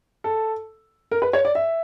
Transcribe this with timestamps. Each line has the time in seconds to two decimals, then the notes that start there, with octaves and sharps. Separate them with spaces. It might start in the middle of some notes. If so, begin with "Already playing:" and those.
0.24 A4
1.11 A#4
1.22 B4
1.33 C#5
1.45 D5
1.55 E5